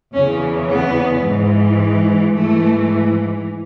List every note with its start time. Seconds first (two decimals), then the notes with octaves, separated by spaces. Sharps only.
0.14 E2 C#3 E3 C#4
0.69 B3
1.24 G#2 E3
2.34 G#2 E3 A3